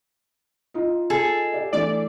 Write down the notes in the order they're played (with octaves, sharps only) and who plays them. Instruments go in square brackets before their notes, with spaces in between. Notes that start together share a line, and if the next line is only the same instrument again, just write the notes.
[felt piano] D#4 F4 D#5
[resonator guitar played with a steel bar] G#4 A4
[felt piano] G4 D5
[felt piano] E3 A3 D4 [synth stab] D5